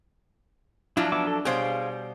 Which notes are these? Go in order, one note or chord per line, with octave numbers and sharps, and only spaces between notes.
F3 F#3 D4 E4 F4
B3 E5 D6
A4
B2 G3 G#4 C5 C#5 F5